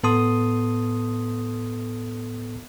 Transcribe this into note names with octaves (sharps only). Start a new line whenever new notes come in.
A2 B3 A4 A5 C6 D#6